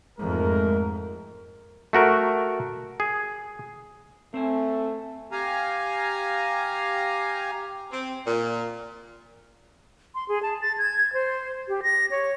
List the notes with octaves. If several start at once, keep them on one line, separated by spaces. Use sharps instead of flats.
F2 G#2 G#3 A3 A#4
A3 F#4 A#4
G#4
A3 C4 C5 G#5
G4 F5 G#5 A#5
C4
A#2
C6
G#4
A5
A6
G#6
C5
G4
A#6
C#5